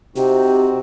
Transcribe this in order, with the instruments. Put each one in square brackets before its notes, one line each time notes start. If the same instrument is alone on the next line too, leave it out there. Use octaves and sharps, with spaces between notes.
[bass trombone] C3 [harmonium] C4 D#4 F#4 [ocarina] G4